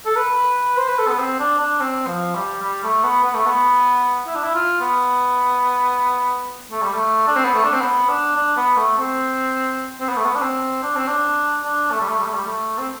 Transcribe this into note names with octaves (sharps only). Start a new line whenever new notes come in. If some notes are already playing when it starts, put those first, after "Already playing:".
A4
B4
C5
B4
A4
B3
C4
D4
D4
C4
F3
G3
G3
A3
B3
B3
A3
B3
E4
D4
E4
F4
B3
A3
G3
A3
D4
C4
B3
A3
D4
C4
B3
D4
D4
B3
A3
C4
C4
B3
A3
B3
D4
C4
D4
C4
D4
D4
A3
G3
A3
G3
A3
G3
A3
C4